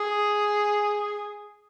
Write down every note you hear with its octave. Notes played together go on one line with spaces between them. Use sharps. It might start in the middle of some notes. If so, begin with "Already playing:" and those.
Already playing: G#4